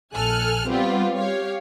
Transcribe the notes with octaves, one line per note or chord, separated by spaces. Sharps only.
A#1 A4 G#5 F6 F#6
G3 B3 C4 F4 G4
G4 C#5 F5